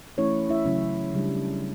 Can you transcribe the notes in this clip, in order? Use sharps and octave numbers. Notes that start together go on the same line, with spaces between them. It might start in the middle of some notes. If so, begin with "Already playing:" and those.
E3 A3 C#4 E4 C#5
E4 E5
C#3 F#3 C#4 E4
C#3 G3 D4